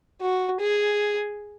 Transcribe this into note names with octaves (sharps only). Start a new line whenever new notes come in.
F#4
G#4